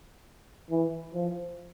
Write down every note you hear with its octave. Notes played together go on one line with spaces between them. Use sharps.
E3
F3